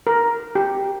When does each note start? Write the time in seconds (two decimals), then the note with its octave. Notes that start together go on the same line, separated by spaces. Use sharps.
0.07 A#4
0.55 G4